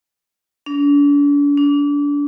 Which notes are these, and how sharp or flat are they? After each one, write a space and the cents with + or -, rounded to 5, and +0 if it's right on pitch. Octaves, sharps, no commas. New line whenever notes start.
D4 -40
D4 -30